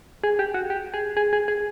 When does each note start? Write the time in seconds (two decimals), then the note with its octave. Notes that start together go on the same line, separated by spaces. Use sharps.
0.24 G#4
0.39 G4
0.54 F#4
0.70 G4
0.94 G#4
1.17 G#4
1.33 G#4
1.48 G#4